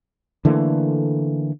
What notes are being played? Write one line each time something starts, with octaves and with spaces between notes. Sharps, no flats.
D3 E3 A3 A#3